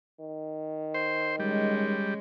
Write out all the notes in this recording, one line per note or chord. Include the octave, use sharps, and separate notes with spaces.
D#3
C5
G3 G#3 C#4